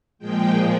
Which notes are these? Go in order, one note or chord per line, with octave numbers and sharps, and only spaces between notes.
A#2 F3 G#3 G5